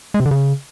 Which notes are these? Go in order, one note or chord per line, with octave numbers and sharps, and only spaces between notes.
G#3
C3
D3
C#3